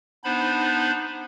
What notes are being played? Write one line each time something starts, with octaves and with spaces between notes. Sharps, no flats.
B3 D4 D#4 C5 B5